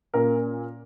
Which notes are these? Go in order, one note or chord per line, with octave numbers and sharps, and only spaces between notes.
A#2 A#3 C#4 A#4